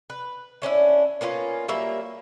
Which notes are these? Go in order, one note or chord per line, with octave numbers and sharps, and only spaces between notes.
B4
A3 C#4 D4 E4
A#3 B3 C#4 F4
F#3 G3 A#3 E5